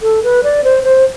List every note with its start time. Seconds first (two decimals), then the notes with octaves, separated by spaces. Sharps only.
0.02 A4
0.23 B4
0.44 D5
0.64 C5
0.84 C5